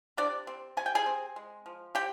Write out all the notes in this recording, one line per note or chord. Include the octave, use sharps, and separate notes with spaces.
C3 D4 D5
C4
C3 G#5
G5
G#4 G#5
C4
G#3
F3
C4 G4 G5